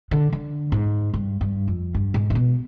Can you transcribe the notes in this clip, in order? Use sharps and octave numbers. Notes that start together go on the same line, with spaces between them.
D3
D3
G#2
G2
G2
F2
G2
G#2
C3
B2